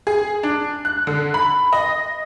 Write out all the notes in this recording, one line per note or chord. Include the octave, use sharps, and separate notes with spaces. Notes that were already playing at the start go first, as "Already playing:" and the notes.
G#4
D4
F#6
D3
B5
D#5